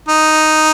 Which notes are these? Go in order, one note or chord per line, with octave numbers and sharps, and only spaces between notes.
D#4